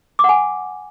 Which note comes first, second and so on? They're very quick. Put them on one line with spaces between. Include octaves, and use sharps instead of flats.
D6 F#5 G#5